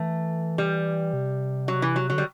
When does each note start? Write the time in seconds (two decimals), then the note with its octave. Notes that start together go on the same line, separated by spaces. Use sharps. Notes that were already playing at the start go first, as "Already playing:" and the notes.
Already playing: E3 A3
0.58 G3
1.13 C3
1.68 F#3
1.82 E3
1.96 F#3
2.10 D3 F#3
2.18 G3